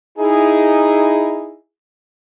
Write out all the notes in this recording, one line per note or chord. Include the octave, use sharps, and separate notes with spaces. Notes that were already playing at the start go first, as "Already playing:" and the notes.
D#4 E4 G#4